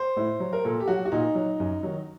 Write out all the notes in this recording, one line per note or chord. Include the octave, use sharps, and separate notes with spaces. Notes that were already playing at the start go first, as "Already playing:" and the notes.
Already playing: C5
A2
F#3
A#4
A#2 A4
G4
F#3 F#4
F#4
A#2 D#4
F#3
F#2
D#3 F#3